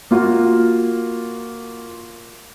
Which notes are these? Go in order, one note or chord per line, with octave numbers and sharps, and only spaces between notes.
A#3 F4 F#4